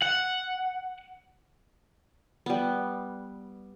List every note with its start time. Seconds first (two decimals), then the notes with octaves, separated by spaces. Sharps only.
0.02 F#5
2.46 G3 B3